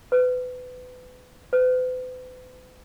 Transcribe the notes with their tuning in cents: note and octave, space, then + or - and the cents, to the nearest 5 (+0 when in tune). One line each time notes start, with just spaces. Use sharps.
B4 +30
B4 +45